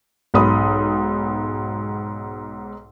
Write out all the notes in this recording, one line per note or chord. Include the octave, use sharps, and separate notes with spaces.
B1 G#2 B5 D#6